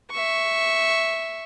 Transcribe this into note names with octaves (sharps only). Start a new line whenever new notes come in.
E5 C#6